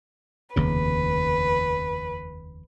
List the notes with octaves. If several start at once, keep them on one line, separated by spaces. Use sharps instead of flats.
F1 D#2 C#3 B4